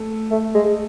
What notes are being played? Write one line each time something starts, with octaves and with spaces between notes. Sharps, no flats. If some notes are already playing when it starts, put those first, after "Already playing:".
Already playing: A3
A3
G#3